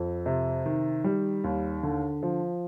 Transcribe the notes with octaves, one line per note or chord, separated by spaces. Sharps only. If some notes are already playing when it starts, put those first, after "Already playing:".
Already playing: F2
C3
D#3
G3
D#2
D3
F3